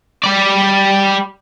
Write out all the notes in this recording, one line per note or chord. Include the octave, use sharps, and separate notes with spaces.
G3 D5